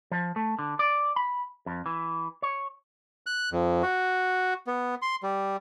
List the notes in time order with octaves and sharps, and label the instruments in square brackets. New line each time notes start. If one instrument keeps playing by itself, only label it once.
[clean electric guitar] F3
A3
D3
D5
B5
F2
E3
C#5
[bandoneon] F#6
F2
F#4
B3
C6
G3